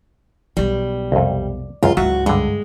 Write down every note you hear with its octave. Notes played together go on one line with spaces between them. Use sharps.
B1 G3 B3
C2 F2
C#2 F#2 F4
C#2 G#2 F#3 F4 F#4 E5
G2 D3 G#3